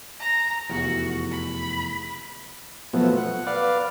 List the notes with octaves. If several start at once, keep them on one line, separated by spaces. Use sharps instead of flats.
A#5
F1 E2 F#4
B5
B2 F3 F#3 A3 B3
F#5
B4 D5 F5